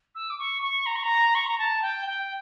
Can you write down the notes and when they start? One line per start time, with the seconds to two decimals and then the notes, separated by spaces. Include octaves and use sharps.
0.14 E6
0.29 D6
0.38 C#6
0.61 C#6
0.85 A#5
0.95 C#6
1.03 A#5
1.34 C#6
1.46 A#5
1.58 A5
1.81 G5
2.06 G5